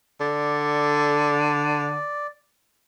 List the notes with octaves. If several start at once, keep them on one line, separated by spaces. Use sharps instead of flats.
D3 D5